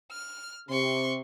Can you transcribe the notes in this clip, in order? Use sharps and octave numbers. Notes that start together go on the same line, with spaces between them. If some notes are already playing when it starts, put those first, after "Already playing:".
F6
C3 C6 C#6